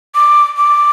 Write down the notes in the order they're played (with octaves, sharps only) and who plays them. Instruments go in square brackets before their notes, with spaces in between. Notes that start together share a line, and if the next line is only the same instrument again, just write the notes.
[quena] D6
D6